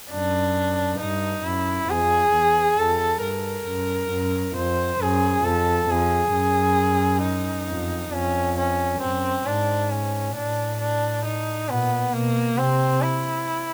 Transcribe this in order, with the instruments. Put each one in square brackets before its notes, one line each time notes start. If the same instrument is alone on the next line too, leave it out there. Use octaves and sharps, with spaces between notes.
[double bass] F#2 [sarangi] D4
[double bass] G2 [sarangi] D#4
[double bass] F#2 [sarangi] E4
[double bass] F2 [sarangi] G#4
[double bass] E2
[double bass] F2 [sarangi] A4
[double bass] G2 [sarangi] A#4
[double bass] F#2
F#2
[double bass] F2 [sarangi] C5
[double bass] F#2 [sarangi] G#4
[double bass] F2 [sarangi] A4
[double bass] F2 [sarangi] G#4
[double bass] F#2
[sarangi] D#4
[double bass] F2
[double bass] F2 [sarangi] C#4
[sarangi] C#4
[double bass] F#2 [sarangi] C4
[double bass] G#2 [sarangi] D4
[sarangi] C#4
[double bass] A2 [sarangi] D4
[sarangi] D4
D#4
[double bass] A#2 [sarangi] B3
[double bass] B2 [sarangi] A#3
[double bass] C3 [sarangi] C4
[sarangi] E4